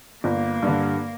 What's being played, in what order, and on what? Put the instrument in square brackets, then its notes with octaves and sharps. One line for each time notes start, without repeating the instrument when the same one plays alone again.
[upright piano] G1 [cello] A#3
[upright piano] G2 D3